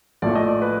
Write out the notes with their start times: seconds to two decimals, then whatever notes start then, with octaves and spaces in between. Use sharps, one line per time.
0.22 A#1 A2 F3 A3 D5
0.35 D#5
0.48 D5
0.62 B4